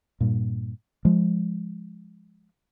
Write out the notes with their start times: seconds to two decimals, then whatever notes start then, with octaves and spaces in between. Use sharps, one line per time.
0.21 G2 A#2
1.05 F3 G#3